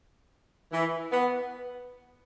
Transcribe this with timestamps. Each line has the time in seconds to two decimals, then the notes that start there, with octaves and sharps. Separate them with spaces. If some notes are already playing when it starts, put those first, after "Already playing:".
0.72 E3
1.12 B3